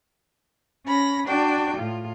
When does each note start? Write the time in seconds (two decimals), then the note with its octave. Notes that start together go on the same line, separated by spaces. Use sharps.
0.85 C#4 B5 A#6
1.27 D4 F#4 D5 G5
1.76 A2 F4